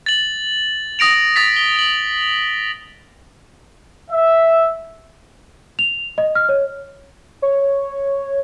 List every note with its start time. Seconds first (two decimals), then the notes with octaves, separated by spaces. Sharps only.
0.06 A6 F#7
0.99 D#6 A#6 D7 F7
1.36 D#6 A6 B6
1.56 G7
1.76 F7 F#7
4.11 E5
5.79 F7
6.18 D#5
6.35 F6
6.49 C#5
7.42 C#5